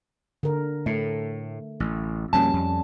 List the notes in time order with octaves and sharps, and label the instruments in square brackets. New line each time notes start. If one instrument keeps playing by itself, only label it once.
[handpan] D3 A#4
[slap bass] A2 [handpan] A3
[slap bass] A1
[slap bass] F2 B2 A#3 [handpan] G3 C#4 [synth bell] A5
[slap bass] F2